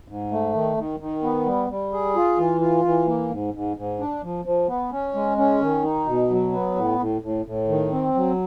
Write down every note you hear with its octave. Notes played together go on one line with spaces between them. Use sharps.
G#2
A3
D#3
D#3
D#3
B3
G3
G3
G#4
F4
E3
F4
E3
A#3
G#2
G#2
G#2
D4
F3
F3
B3
C#4
G#3
C#4
D#3
D#4
B2
F#3
B3
A2
A2
A2
A2
D#3
C4
F#3